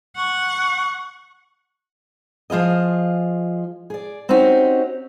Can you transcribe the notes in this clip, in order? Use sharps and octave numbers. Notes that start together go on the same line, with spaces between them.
F#5 C#6
F3 F4 G#4 D#5
G#4 D5
C4 C#4 D#4 F#4 G4